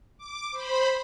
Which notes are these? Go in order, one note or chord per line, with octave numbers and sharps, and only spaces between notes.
D6
C5 B5